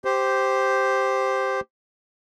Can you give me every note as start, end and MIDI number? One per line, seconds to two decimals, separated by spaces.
0.05 1.60 67
0.05 1.60 72